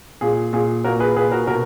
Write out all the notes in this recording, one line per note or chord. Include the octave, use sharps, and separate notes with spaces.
A#2 G#4
A#2 G#4
A#2 F#4 A#4
G#4 B4
A#2 G#4 B4
F#4 A#4
B2 F#4 A#4